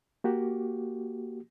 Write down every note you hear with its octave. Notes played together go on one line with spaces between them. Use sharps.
A#3 F#4 G4